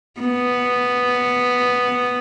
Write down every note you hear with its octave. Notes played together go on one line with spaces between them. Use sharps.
B3